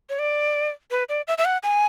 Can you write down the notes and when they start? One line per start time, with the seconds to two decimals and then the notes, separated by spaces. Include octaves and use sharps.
0.09 C#5
0.19 D5
0.91 B4
1.09 D5
1.28 E5
1.38 E5
1.45 F#5
1.63 G#5